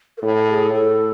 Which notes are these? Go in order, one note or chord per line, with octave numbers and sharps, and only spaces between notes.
A#4
A2 A4
G#4
A2 A4